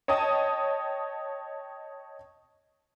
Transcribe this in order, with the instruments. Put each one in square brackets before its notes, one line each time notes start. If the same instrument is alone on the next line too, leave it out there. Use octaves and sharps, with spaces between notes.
[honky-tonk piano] C#5 D#5 G5 A5 D#6